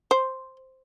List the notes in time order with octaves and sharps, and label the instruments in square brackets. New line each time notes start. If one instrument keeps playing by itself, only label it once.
[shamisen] C5